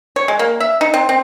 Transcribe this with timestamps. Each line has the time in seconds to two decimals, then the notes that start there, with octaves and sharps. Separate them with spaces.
0.16 C#5
0.28 G#3
0.39 A#3
0.60 E5
0.81 D#4
0.94 C4
1.09 C4